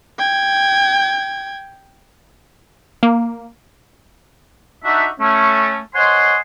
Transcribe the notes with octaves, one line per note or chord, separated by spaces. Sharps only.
G5 G#6
A#3
D4 D#4 F#4 E5
A3 C#4
C5 C#5 D#5 F#5 G#5 C6